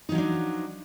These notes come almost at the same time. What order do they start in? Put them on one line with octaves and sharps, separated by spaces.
D#4 F#3 F3 D4